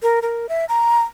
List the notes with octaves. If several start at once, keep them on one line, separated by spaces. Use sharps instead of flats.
A#4
A#4
E5
A#5